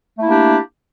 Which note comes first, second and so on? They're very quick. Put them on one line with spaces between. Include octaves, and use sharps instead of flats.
A3 E4 A#3 G4 D4